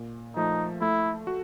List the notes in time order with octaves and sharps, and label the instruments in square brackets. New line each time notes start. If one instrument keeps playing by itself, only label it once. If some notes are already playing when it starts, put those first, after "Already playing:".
Already playing: [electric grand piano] A#2
[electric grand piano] F3 A3 [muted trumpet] D#4
[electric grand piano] A3 [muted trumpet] E4
[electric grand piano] F#4